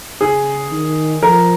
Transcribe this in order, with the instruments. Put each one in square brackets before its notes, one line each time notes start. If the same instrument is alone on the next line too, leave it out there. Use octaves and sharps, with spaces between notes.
[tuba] C#3 [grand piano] G#4
[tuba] D#3
[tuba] F3 [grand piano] A#4